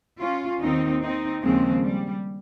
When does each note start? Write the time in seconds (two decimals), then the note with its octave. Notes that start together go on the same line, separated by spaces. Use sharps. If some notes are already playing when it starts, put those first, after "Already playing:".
0.20 C#4 F4
0.61 D#2 D#3 C4 D#4
1.02 C4 D#4
1.42 D#2 C#3 F3 G#3 C4
1.82 G3